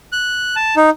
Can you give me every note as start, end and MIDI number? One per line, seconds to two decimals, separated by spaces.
0.12 0.55 90
0.56 0.75 81
0.76 0.90 63